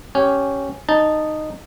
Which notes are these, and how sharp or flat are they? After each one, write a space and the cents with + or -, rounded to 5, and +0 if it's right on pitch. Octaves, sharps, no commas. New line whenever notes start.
C#4 +0 G4 -10 G#5 -10
D#4 -10 A5 +0